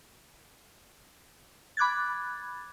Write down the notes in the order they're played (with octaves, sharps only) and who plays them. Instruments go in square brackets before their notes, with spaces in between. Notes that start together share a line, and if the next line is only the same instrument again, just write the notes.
[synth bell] B5 D6 F#6 G#6 A6